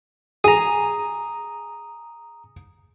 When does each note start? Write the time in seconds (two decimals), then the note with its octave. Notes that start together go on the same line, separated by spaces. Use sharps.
0.44 G#4 A#5 D#6